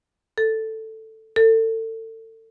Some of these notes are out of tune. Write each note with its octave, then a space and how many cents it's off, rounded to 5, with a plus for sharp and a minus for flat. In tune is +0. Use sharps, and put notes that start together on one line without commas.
A4 +5
A4 +30